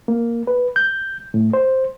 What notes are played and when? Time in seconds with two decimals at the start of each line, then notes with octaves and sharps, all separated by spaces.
0.08 A#3
0.47 B4
0.76 G6
1.34 A2
1.53 C5